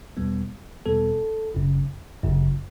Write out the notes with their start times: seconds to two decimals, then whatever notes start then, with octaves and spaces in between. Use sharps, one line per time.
0.17 E2 B2 G3 B3
0.85 E2 B2 G3 B3 A4
1.54 G1 F#2 C#3
2.23 G1 F#2 C#3